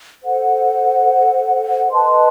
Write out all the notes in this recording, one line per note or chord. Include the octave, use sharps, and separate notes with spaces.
A4 C5 F#5
B4 D#5 A5 C6